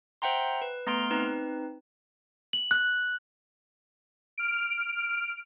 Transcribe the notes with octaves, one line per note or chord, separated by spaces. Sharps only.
C5 E5 F#5 G5 A#5 C6
B4
A3 B3 A#5 C6 F6 D7
C4 D#4 B4
F#7
F#6
F6 D7